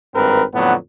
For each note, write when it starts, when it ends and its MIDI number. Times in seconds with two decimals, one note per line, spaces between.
0.14 0.43 32
0.14 0.43 43
0.14 0.43 60
0.14 0.43 70
0.14 0.43 71
0.53 0.74 41
0.53 0.74 45
0.53 0.74 50
0.53 0.74 54
0.53 0.74 59